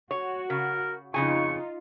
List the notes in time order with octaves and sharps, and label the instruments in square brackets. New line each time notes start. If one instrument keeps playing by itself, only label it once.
[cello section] F#4 [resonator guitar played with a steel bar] C#5
[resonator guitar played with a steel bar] C#3 [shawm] A#4
[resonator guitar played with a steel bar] F2 C#3 G#5 [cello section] D#4 F4 [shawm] C#6